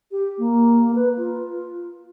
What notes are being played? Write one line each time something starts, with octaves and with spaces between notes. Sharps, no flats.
G4
A#3
B4
F4